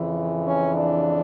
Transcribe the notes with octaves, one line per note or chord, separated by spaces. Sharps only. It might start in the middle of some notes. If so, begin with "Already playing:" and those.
Already playing: F2 C#3 E3
C#4
D4